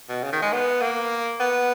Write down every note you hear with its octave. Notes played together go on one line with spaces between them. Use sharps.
B2
C#3
D#3
G#3
B3
A#3
B3